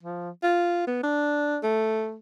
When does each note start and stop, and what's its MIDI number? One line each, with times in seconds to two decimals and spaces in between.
0.03 0.30 53
0.43 0.83 65
0.87 1.02 59
1.03 1.58 62
1.63 2.17 57